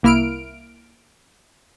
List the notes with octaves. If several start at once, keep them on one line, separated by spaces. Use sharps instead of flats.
C2 A#3 E4 F6 D7